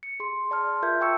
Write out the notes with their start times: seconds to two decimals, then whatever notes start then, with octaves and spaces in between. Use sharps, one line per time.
0.03 C#7
0.20 G#4 C6
0.51 D5 A5 C6 F6
0.82 F4 A#4 E5 G6 G#6
1.01 G5 A5 C#6 E6 C#7